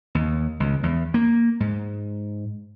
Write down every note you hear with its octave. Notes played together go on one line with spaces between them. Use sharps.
D#2
C#2
E2
A#3
G#2